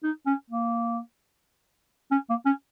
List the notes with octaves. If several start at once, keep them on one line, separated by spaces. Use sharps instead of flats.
D#4
C#4
A#3
C#4
A#3
C#4